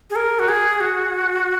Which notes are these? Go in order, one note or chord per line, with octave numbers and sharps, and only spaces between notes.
G#4
A#4
F#4
G#4
F#4